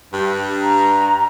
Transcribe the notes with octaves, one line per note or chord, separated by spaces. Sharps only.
G2
A#5